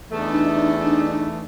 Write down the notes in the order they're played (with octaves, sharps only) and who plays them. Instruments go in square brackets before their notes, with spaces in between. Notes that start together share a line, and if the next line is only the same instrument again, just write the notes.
[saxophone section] E2 A3 [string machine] D4 D#4